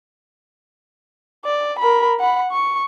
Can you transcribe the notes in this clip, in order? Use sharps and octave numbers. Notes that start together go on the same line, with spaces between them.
D5
A#4 B5
F#5 B5
C#6